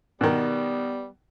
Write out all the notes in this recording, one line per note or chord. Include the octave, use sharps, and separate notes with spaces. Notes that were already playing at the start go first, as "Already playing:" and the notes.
B2 D#3 G3 B3